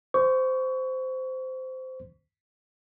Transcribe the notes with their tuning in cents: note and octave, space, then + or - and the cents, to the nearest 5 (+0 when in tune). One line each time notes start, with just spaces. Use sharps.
C5 -15 C#6 +25